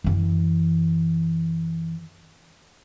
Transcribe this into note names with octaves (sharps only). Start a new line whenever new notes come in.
F#2 E3